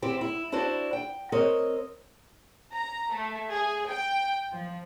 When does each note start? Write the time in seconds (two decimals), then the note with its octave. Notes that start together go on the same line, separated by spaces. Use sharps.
0.02 C4 E4 G4
0.21 E4
0.52 D4 E4 F#4 C5 D5
0.93 G5
1.32 C4 A#4 C#5 D#5
2.73 A#5
3.13 A3
3.51 G#4
3.91 G5
4.52 F3